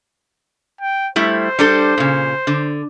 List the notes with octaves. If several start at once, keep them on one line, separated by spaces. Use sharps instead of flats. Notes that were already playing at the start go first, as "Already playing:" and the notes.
G5
G3 A3 E4 C5
G3 D4 A4
A#2 C#3
D3